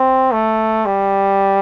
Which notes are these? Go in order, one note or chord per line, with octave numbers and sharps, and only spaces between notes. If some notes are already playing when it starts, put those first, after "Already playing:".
Already playing: C4
A3
G3